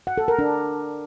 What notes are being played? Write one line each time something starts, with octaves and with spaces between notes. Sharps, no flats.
F#5
A4
A#4
D4